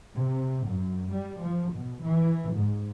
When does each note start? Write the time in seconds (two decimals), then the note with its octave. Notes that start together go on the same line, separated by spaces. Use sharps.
0.16 C3
0.69 F#2
1.12 G3
1.43 F3
1.74 B2
2.04 E3
2.57 G#2